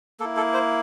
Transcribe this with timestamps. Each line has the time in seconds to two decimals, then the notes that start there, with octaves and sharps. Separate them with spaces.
0.20 A#3 A4
0.24 E4
0.37 A4
0.54 C5